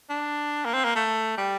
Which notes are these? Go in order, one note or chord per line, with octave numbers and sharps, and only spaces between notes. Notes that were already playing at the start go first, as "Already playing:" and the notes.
D4
A#3
C4
A#3
A3
G3